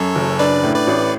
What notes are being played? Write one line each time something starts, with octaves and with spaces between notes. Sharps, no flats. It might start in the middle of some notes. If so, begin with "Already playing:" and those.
Already playing: F#2 A4 C#5
F#1
D4 B4 D5
A2
B4 D5
A1